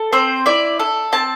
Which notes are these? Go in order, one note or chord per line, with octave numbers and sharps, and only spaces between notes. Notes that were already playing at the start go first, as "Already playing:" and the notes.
Already playing: A4
C4 C5
E4 D5
A4
C4 A5